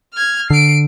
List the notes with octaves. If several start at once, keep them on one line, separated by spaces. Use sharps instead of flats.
F6 G#6
D3 C7 D7